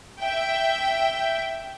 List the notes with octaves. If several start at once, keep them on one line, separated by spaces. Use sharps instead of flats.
E5 G5